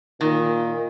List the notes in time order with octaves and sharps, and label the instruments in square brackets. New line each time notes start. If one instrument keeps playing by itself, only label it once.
[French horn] A#2 [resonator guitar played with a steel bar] D#3